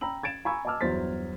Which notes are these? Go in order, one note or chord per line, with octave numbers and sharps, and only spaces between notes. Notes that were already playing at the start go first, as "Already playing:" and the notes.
G5 A#5 B5 E6 F#7
G#6 A6 D7 E7
G#5 A#5 B5 C#6 E6 G#6
D#5 G#5 A5 D6 E6 F6
G1 E2 F#3 C5 A6 B6